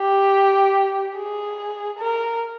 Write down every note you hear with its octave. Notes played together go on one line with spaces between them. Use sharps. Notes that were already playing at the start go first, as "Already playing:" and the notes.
Already playing: G4
G#4
A#4